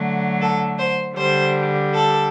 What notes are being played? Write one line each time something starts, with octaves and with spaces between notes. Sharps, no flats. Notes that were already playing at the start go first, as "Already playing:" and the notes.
Already playing: D3 F#3 A3
A4
C5
D3 G3 C5
A4